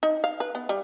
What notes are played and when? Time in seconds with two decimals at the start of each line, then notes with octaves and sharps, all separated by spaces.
0.03 D#4
0.24 F5
0.40 B4
0.55 B3
0.69 G3